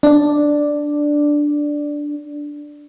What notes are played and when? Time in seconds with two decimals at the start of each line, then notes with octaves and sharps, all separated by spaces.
0.03 D4 D5